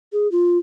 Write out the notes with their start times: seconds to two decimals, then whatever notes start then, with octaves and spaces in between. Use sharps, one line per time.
0.13 G#4
0.32 F4